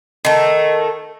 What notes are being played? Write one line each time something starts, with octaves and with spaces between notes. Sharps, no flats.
D#3 A3